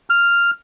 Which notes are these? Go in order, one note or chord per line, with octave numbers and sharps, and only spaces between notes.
F6